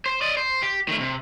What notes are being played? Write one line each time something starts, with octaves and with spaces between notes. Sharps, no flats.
C5
D5 D#5
C5
G4
D#3 A3
C3